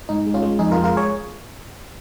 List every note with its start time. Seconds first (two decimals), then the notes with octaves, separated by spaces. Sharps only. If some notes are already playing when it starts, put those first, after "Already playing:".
0.09 G#2 D#4
0.26 G#3
0.34 C#4 F4
0.42 G#3
0.59 F2 D#4 G#4
0.71 F4 A#4
0.76 G#3
0.84 F4 A#4
0.96 G#4 C#5